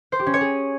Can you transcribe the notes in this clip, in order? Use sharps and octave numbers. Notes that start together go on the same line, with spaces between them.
C5
G4
C#4
C#5
G#4